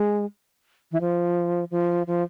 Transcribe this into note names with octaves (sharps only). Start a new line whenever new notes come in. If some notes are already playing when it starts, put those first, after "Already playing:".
Already playing: G#3
E3
F3
F3
F3